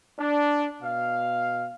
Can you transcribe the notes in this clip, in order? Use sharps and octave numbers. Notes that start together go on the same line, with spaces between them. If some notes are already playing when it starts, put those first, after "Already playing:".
D4
B2 F5